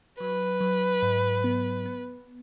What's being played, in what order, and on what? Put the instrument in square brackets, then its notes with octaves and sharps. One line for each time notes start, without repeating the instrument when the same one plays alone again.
[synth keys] F#3 [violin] B4
[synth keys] F#3
G#2
B3
B3